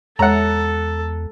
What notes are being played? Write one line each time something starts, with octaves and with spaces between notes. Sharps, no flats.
E2 G#3 A4 C#5 E5 F#5 A#5